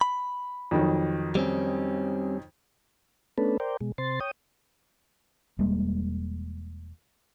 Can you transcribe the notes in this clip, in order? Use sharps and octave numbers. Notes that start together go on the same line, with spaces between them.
B5
F2 D#3 F#3
G3 C4 C#4
A3 B3 C#4 D4 A4 B4
A#4 C5 D5 G5
B2 G#3
C3 C5 C6 A6
C#5 G5 D#6
E1 G3 G#3 A#3